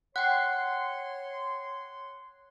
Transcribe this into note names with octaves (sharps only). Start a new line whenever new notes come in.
C#5 F#5 G5 C6 F#6 C7